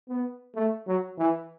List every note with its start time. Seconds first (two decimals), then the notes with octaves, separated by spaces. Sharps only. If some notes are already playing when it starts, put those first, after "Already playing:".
0.09 B3
0.56 A3
0.87 F#3
1.18 E3